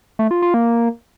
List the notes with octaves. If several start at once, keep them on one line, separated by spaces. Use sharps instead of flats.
A3
F4
F4
A#3